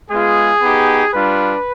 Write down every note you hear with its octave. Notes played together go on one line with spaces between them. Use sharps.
G#3 B3 F4 G#4
B3 D#4 G4
G3 D4 F4 B4